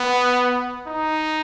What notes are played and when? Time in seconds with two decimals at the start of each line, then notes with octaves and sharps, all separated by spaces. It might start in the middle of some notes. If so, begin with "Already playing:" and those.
Already playing: B3
0.87 D#4